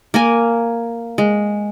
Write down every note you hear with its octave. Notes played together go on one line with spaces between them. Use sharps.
A#3 A#4 G#5
G#3